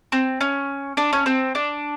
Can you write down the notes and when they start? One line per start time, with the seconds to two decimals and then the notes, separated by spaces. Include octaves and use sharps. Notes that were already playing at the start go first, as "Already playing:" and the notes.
0.12 C4
0.41 C#4
0.97 D4
1.13 C#4
1.26 C4
1.55 D4